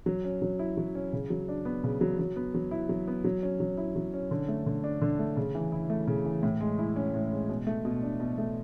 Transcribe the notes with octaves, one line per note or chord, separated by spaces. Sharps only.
F#3
C#4
F#3
E4
F#3
C#4
C#3
F#3
D4
B3
C#3
F#3
F#3
B3
F#3
E4
F#3
B3
F#3
C#4
F#3
E4
F#3
C#4
D3
A3
D3
D4
D3
A3
C#3
E3
E4
A3
C#3
E3
A2
G#3
E4
C#4
A2
G#3
B2
A3
B2
D4
B2
A3